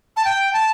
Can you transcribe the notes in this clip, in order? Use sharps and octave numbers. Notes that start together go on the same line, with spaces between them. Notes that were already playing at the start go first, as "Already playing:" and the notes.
A5
G5
A5